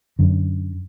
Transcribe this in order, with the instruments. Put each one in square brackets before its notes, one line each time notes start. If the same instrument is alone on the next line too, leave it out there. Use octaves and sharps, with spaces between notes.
[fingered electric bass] F#2 D3